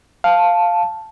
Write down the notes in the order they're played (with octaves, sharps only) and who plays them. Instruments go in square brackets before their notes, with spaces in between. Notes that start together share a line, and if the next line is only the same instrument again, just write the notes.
[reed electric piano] F5 [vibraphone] A5